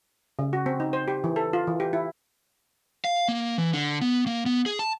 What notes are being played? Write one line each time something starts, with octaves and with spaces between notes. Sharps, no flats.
C#3
F#4
C4
D#4
C5
G4
E3
A4
F4
E3
G4
E4
F5
A#3
E3
D3
B3
A#3
B3
G#4
A5